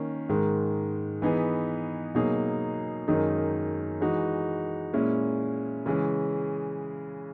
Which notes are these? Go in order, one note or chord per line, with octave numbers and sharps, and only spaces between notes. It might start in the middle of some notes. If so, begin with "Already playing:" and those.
Already playing: D#3 A#3 C#4
G#2 D#3 G#3
E3 B3 D#4 G#4 B4
B2 F#3 A#3 D#4 G#4
F#2 D#3 G#3 D#4
E3 G#3 D#4 F#4
A#2 G#3 C#4 E4
C#3 E3 G#3 C#4